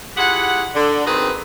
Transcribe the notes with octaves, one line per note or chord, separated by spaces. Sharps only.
E4 F4 G4 G#4 F#5
D3
D#3 C4 F#4 G#4 A#4 B4